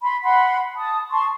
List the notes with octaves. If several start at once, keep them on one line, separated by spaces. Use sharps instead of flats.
B5 C6
F#5 B5 C6
A5 D#6
A5 C6 C#6